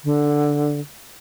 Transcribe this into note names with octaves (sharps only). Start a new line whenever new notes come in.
D3